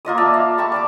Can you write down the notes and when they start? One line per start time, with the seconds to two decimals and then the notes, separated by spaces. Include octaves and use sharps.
0.05 A#3 F4 D#5 D#6
0.18 D5 E5 A5 A#5
0.34 F5
0.58 G5 A5 B5 C#6
0.72 D5 A5 D6